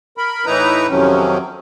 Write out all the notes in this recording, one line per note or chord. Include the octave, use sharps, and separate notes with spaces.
A#4 B5
A2 E3 D#4 E4 B4 A#5
F2 C3 D#3 F3 F#3 C#4